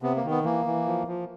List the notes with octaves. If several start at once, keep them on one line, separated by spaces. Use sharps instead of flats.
C3 B3
A#3
D#3
B3
E3 A#3
E3
F3
F3